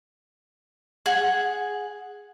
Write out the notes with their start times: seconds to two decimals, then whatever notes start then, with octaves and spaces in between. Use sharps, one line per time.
1.06 G#4 F#5